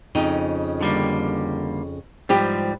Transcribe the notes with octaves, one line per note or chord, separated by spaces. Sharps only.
F2 C#3 D#4
D3 G3 A#3
G#2 F3 G3 G4 B4